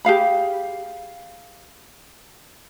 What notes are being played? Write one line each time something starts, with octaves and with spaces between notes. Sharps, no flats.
G4 G#4 F5 B5